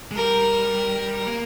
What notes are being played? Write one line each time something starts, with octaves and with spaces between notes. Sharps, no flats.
G#3
G3 A#4
A#3